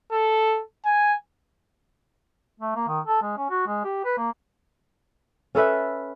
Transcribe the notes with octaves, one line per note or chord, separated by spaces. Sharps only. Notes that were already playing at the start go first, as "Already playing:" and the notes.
A4
G#5
A3
A#3
D#3
A4
G#3
C#4
F#4
G#3
G4
B4
A#3
C#4 A4 B4 E5